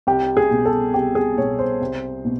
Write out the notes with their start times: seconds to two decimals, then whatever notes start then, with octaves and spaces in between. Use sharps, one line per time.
0.07 C2 G4
0.37 G#4
0.51 B2
0.65 A4
0.94 C2 G4
1.15 G#4
1.37 B2 C#5
1.59 C5
1.81 C2
2.25 B2